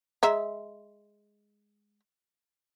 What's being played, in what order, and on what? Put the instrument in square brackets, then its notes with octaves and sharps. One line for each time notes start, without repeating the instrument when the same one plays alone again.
[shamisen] G#3 E5 A#5